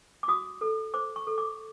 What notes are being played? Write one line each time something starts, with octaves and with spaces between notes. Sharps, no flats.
D6
F#4 D#6
A4
C5 D6
C#6
A4
D6